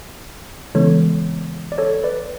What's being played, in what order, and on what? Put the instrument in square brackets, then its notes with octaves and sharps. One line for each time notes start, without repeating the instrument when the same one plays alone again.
[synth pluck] C#3 E3 G#3 B3 [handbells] A4 C#5
[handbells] D5
A4 C#5
B4 D5